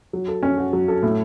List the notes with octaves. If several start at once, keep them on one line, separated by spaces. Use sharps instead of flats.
F#3
A4
C#4
F#4
F#3
A4
A2